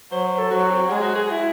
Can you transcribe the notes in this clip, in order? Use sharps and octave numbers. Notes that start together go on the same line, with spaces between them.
F#3 C5
C5
A4
F#3 F#4
C4
G#3 G#4
F#4
G#4
E4